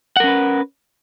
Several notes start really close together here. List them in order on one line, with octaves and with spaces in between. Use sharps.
F#5 A#4 C#4 B4